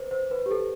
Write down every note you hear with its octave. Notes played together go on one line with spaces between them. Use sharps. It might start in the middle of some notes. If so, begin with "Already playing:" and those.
Already playing: B4 C5
C5
B4
G4
A4